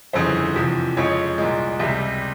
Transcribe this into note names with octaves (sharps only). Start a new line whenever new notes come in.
G1 F2 C#3 E3 C5
E2 C3 F3
F2 C#3 F3 G#3 C#5
C2 A#2 G#3
C#2 C3 G3 E5